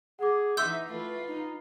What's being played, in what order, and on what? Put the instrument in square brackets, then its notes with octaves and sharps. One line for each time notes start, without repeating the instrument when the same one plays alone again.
[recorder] G#4 [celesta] F#5 D6
[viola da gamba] E3 D#4 [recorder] E5 [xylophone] C6 E6 G6
[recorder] A3 [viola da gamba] F4 B4
[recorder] D#4